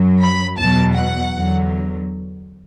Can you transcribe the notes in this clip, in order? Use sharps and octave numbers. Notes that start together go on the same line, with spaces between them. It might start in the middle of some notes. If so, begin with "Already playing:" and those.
Already playing: F#2 F#3
B5
E2 B2 F#3 A5
F#5
E2 D3 F#3